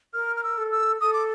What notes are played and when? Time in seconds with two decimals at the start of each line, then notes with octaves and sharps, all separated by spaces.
0.13 A#4 F6
0.36 F6
0.43 E6
0.58 A4
0.72 E6
1.01 A4 D#6
1.13 D6